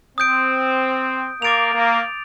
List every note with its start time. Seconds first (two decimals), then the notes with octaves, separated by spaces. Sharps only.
0.18 C4 D#6 G6 D7
1.42 A#3 D6 A6 D7 F7
1.73 A#3